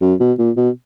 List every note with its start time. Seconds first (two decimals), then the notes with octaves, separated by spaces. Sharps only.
0.01 F#2
0.20 B2
0.38 A#2
0.57 B2